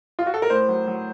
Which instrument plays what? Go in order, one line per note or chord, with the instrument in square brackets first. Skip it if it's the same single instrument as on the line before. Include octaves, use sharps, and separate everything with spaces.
[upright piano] F4
F#4
A4
A#4
A2 C5
F#3
F#3